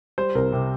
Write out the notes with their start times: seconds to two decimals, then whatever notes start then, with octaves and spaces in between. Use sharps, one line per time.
0.18 G3 C5
0.35 C2 A#4
0.52 C3